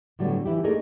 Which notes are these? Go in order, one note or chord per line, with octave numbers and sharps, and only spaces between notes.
A2 D3 F#3 G3 A3 B3
E3 E4 G4
A3 A#3 D4 D#4 G#4 A#4